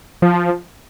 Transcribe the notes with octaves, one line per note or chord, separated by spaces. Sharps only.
F3